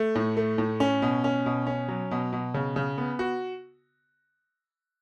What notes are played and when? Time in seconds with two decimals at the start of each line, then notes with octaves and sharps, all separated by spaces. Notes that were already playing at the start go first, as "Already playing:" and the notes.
Already playing: A3
0.15 A2
0.37 A3
0.58 A2
0.80 C#4
1.02 B2
1.24 C#4
1.46 B2
1.67 C#4
1.88 F#3
2.11 B2
2.33 B2
2.54 C#3
2.76 C#3
2.98 B3
3.19 F#4